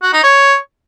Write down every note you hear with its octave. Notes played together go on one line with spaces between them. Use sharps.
F#4
D#4
C#5